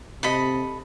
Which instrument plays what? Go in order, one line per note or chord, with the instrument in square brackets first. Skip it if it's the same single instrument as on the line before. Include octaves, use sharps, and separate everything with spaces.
[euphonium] C3 [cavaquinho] A4 D#5 B5